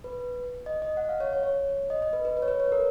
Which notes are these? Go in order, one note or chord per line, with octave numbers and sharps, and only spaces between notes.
B4
D#5
D#5
F#5
F5
C#5
C#5
C#5
D#5
D#5
B4
B4
B4
C#5
B4
C#5
A#4